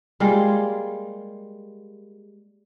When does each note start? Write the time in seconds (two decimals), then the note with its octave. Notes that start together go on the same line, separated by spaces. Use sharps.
0.20 G3 G#3 A#3 F4